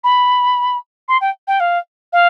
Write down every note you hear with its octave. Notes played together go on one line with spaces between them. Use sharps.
B5
C6
G5
G5
F5
F5